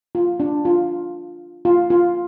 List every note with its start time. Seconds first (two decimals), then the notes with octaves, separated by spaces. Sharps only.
0.15 F4
0.40 D4
0.65 F4
1.65 F4
1.90 F4